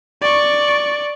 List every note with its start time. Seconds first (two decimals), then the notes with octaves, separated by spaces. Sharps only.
0.21 D5 C#6